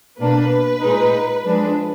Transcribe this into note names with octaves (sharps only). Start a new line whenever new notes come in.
B2 A#3 D4 B4
A#2 G#3 D#4
F3 G#3 D4